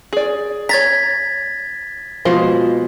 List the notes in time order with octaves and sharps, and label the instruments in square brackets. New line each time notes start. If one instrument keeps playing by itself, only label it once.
[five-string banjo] G#4 D5
[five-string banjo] C#5 A#5 [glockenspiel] G#6 A6 B6
[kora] B2 F3 [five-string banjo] G#3 A#3 C5